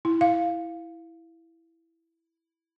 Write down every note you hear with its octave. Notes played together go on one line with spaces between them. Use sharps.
E4
F5